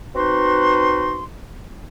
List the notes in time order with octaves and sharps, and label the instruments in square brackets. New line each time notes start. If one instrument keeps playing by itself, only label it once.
[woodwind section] C4 D#4 F#4 B4 C6